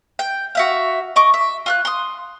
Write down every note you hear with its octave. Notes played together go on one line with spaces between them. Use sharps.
G5
F#4 E5 F5
D#5 C#6 D6
E5
F4 F6 F#6
C6 D#6